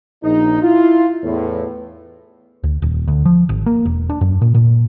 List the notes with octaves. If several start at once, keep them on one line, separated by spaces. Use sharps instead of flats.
A#1 D#4
E4 F4
E2 A2
D2
D#1
D2
F3
G#1
A#3
E1
D4
F#2
A#2
A#2